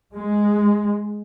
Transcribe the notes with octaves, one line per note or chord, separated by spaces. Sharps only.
G#3